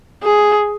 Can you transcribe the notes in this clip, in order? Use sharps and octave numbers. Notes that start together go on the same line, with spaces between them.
G#4